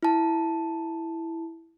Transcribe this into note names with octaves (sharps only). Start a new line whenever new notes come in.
E4 A5